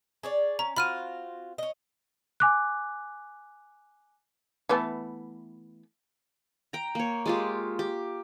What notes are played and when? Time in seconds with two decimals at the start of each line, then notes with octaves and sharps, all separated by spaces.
0.23 G#4 C#5 D5
0.59 C#4 A#5
0.76 C4 F4 F#4 B5 F6 D#7
1.58 C#5 D#5
2.40 G#5 D6 F#6
4.69 E3 A3 B3
6.73 G5 A#5
6.95 A#3 C#5
7.26 G#3 F4 G4
7.79 G4